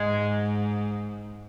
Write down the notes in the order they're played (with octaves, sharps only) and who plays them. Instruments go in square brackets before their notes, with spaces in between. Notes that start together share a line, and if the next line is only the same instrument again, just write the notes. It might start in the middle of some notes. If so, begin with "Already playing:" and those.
Already playing: [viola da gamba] G#2 [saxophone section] G#3